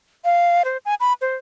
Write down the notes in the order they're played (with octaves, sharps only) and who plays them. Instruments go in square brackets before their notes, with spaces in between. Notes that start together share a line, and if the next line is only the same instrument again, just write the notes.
[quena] F5
C5
G#5
B5
C5